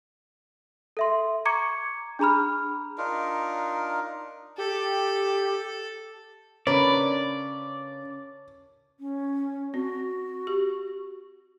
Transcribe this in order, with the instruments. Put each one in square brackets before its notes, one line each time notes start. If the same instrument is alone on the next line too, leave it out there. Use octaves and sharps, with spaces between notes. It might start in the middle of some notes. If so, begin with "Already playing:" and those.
[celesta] A4 E5 C6
A#5 C#6 D6 G#6 C#7
D4 G#4 A#5 B5 F6
[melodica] D4 D#4 F4 A#4
[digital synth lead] G4 [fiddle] A4
[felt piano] C#3 [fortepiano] C#4 [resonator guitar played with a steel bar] D4 A#4 B4 [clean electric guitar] D5
[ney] C#4
[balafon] C4 [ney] F#4
[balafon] G4